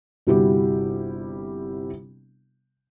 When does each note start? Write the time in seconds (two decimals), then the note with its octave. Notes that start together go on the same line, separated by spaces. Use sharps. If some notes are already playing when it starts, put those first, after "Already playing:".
0.27 G1 C3 G3 E4 F#4 G4